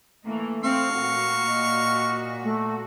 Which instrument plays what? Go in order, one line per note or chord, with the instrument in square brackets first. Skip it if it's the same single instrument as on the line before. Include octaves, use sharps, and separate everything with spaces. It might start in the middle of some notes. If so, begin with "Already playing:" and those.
[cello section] E3 A#3 [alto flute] A3
[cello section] C4 [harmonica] F5 C#6
[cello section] A#2 F#4
[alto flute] D#5
A3